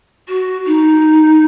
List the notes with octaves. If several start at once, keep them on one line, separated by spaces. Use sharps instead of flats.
F#4
D#4